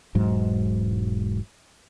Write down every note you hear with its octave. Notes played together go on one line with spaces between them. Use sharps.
E1 G#2 F#3